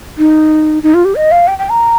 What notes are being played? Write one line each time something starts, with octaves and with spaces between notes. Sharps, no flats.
D#4
D#4
F4
G4
D#5
F5
G5
G5
A#5